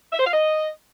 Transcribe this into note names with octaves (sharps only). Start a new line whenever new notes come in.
E5
C5
F5
D#5